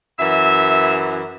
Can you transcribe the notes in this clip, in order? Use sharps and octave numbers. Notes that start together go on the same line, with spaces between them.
F#2 E3 E5